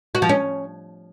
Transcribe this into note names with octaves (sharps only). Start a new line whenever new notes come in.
F#4
F3
C#4